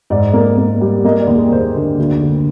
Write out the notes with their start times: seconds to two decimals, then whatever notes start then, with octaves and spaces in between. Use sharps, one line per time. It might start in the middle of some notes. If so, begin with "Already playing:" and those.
0.10 G#2 D5
0.33 A#3
0.57 A#3
0.81 G3
1.04 A#3 D#5
1.20 D5
1.27 D#2
1.35 G#4
1.51 D#2 C5
1.75 D3
1.99 D2
2.21 D3